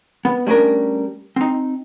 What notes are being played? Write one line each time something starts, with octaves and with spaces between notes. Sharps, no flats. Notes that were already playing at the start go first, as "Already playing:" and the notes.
B3
G3 A3 C#4 D4 A#4
C4 D#4